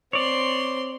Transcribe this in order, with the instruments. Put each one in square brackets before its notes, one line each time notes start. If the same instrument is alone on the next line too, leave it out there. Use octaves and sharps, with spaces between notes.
[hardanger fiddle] C4 C6 [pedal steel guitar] C#5 D5